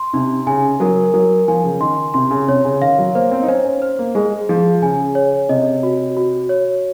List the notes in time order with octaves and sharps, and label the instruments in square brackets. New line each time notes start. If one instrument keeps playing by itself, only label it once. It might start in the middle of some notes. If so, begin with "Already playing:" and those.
Already playing: [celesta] C6
[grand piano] C3 [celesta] D#4
[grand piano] C#3 [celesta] G#5
[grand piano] F#3 [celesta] A#4
[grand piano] F#3 [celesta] A#4
[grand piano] F3 [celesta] G#5
[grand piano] C#3
[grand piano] D#3 [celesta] C6
[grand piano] C3 [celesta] C6
[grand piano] C#3
[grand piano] C3 [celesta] C#5
[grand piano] C#3
[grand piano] D#3 [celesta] F5
[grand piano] F#3
[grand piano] A#3 [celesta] C5
[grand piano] C4
D#4
[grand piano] C#4 [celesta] C5
[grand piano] C#4
[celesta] C5
[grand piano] A#3
[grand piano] G#3 [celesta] G#4
[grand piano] F3 [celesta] G#4
[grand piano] C#3 [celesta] G#5
[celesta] C#5
[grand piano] C3 [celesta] D#5
[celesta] F#4
F#4
C#5